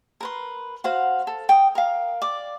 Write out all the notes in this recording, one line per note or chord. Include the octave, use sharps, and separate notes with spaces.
A#4 B4 C6
F#4 C5 F5 F#5
A4
G5 D#6
A#4 F5
D5 D6